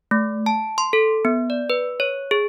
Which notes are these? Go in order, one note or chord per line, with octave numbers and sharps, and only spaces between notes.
A3
A5
C6
A4
B3
D5
B4
C#5
G#4